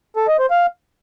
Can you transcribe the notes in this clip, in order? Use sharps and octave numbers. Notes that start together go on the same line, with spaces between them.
A4
D#5
C5
F5